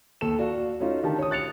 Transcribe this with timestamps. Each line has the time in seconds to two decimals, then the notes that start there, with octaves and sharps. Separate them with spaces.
0.21 D#2 A4 E7
0.39 F#4 D5 F5
0.80 A3 C#4 D#4 F4 F#4
1.03 D3 D#3 G4 A5
1.19 C#5 D#6
1.31 F#6 A6 C#7 F7